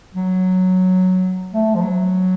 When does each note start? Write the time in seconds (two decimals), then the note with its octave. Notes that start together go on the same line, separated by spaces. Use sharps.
0.15 F#3
1.53 A3
1.75 F3
1.82 F#3